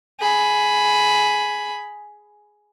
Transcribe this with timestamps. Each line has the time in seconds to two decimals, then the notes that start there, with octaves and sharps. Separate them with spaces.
0.20 G#4 B5